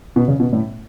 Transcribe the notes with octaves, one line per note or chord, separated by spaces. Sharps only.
B2
C#3
B2
A2